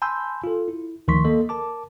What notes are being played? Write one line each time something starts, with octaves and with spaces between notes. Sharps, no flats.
G#5 A5 B5 C6 E6 G6
F4 A4
E4
D2 D#3 F3 C6 C#6 B6
A#3 A4 D#5
A#4 A5 D6